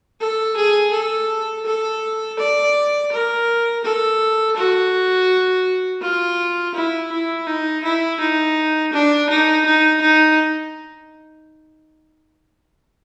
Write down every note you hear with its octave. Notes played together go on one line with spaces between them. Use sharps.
A4
G#4
A4
A4
D5
A#4
A4
F#4
F4
E4
E4
D#4
E4
D#4
D4
D#4
D#4
D#4